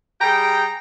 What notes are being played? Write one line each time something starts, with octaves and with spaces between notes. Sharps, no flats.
G3 G#4 G5 A#5